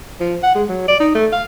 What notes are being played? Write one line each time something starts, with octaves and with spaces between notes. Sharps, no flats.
F3
F#5
G#3
F#3
D5
D#4
A3
F5